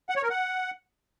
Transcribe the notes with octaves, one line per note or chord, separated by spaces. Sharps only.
F#5
C#5
A#4
F#5